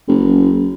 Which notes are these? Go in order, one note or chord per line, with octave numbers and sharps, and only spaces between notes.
F#1